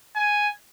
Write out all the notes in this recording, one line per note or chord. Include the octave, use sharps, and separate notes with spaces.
G#5